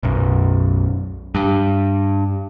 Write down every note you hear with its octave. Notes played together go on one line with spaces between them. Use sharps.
B1 F#2
G2